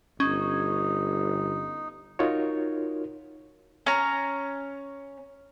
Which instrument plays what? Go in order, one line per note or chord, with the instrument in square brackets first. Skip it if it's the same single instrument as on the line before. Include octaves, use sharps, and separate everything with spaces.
[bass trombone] G1 [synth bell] C#4 [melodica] D#4
[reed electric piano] D#4 F4 F#4 A#4 C#5
[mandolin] C#4 A#5